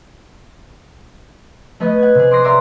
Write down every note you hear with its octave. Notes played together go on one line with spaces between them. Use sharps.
A3 B3 D#5 B6
F#5 G#6
C3 G#4
C6 D6 D#6 F#6 A#6 C7
A#4 D5 E5 A#5 C6